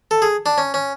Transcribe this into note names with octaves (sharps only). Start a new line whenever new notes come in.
A4
G#4
D4
C#4
C#4